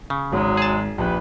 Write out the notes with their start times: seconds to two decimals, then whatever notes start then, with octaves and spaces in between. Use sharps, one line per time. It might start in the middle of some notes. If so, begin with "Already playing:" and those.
0.10 C#3
0.32 G#1 F#3 G#3
0.57 G#4 A5
0.98 A#1 G4 B4